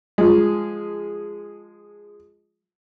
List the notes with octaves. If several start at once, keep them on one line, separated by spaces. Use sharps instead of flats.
F3 G#3